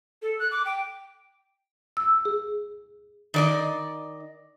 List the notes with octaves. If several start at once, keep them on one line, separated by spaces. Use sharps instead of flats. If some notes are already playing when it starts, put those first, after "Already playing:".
A4
F#6
D6
G5
E6
G#4
D#3 D5 D#5